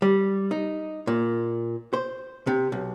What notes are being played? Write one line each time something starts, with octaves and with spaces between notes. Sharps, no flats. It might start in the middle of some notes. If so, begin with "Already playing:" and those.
G3
D#4
A#2
C5
C3
B1